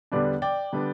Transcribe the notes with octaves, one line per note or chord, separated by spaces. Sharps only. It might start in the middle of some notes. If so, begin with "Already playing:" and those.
E2 D3 G3 B3 D4 D5
D5 G5
D3 G3 B3 D4